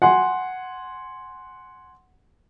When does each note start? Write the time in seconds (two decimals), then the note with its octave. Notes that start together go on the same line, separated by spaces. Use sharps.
0.02 F#5 G#5 C6